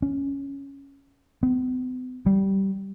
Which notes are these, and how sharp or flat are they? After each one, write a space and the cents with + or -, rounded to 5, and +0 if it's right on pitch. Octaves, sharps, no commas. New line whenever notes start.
C#4 +0
B3 +45
G3 -15